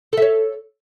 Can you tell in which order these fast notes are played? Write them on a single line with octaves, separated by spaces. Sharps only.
A4 E5 C#5